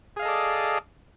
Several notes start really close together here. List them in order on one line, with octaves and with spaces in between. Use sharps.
G#4 F5 D#5 A4 D5